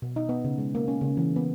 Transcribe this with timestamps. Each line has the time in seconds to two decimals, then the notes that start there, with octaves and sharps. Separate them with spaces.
0.02 B2
0.16 D#4
0.29 B3
0.45 C#3
0.58 G#3
0.75 A#3
0.88 C#4
1.01 C#3
1.17 E3
1.36 B3